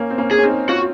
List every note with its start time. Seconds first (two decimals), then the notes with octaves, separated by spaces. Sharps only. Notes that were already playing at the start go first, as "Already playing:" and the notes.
Already playing: A#3 C#4
0.10 C4
0.18 A#3 C#4
0.31 G#4
0.38 C#4
0.44 C4 D#4
0.68 C#4 F4 F#4